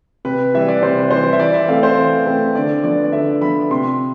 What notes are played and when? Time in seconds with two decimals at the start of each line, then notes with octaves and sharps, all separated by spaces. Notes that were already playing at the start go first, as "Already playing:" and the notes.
0.25 C3 B4
0.54 E3 G3 E5
0.68 D5
0.83 C3 C5
1.11 E3 G3 C5
1.33 E5
1.40 E3 D5
1.54 E5
1.68 A3 C4 F5
1.83 C5
1.97 E3
2.26 A3 C4
2.55 D3 D5
2.84 F3 B3 D5
3.04 D5
3.12 D3 E5
3.41 F3 B3 B5
3.71 C3 C6